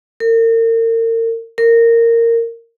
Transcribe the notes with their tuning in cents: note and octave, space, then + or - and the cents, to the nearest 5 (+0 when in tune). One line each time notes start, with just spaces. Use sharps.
A#4 -40
A#4 -15